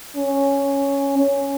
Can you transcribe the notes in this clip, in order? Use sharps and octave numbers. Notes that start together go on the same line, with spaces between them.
C#4
C#4